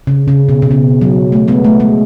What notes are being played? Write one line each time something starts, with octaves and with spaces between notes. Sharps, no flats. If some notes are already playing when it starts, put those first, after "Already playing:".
C#3
C#3
B2
B2
C#3
F#3
A3
G#3 B3
A3
G#3